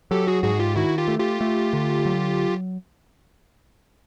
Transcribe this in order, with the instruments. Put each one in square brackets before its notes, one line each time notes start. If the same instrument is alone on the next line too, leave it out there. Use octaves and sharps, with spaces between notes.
[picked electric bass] F#3 [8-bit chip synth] G4 A4
[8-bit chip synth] F#4 G#4
[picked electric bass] G#2 [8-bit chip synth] F#4 G#4
[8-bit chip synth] F4 G4
[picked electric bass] D#3 [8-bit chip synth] E4 F#4
[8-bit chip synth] F4 G4
[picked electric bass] A3
[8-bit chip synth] F4 G4
[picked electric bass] A3
D3
F#3